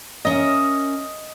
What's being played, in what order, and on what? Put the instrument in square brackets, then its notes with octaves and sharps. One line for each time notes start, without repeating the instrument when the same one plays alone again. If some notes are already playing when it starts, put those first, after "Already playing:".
[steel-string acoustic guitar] C#4 A#4 E5 [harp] D#5